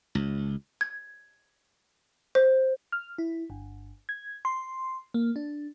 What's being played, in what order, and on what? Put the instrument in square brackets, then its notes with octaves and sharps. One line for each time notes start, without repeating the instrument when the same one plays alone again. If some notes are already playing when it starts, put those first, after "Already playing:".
[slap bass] C#2
[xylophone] G#6
C5
[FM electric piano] F6
E4
G1
G#6
C6
A#3
D4